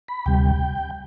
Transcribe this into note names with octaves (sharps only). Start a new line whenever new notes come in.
B5
D2 C3 G3 G5